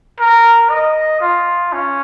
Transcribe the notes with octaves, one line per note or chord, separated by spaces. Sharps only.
A#4
D#5
F4
C#4